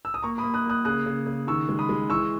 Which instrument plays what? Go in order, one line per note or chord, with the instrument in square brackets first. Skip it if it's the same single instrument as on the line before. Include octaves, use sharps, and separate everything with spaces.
[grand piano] E6
D#6
A#3 A#5 C#6
B5 D#6
A#3
D#6 F#6
A#3 D#6 F#6
C#3 D#6 F#6
C#3
C#3
D#3 C#6 E6
G#3
B5 D#6
G#3
E3 C#6 E6